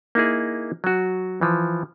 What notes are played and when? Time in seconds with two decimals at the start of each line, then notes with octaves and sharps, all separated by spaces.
0.15 A#3 D#4 E4 G#4
0.84 F#3 F#4
1.41 E3 F3